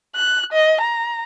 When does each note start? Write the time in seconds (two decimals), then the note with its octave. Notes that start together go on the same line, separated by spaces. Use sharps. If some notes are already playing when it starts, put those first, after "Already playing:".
0.16 F#6
0.53 D#5
0.81 A#5